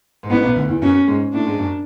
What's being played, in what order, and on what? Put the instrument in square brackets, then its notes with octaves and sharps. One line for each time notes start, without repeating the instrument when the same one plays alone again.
[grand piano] G#2
[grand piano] A1 A2 [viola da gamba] B3
[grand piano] B1 B2
D2 D3
E2 E3
[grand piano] F#2 F#3 [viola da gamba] C#4
[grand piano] G#2 G#3
[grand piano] A2 A3 [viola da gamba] D4
[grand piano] G#2 G#3
F#2 F#3